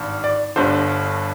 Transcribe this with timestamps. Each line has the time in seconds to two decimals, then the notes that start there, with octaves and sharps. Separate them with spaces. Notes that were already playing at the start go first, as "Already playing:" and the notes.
Already playing: G#1 G2
0.24 D5
0.56 G1 G2 D3 C5